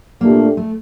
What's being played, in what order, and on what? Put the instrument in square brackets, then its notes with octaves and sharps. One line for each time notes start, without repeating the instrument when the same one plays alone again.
[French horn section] A#2 A3 D4 G4 [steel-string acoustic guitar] A#3
[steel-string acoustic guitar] A3